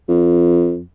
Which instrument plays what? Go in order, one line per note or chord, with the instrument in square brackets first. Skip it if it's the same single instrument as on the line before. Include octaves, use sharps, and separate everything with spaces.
[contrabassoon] F2